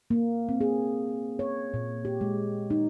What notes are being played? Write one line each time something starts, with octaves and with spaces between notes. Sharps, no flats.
A#3
C4
G#4
C#5
A#2
G4
G#3
D#4